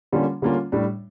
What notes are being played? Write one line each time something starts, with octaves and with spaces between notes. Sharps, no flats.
D3 G3 A#3 C#4 F4
D3 G3 A#3 C#4 F4
A2 G3 D4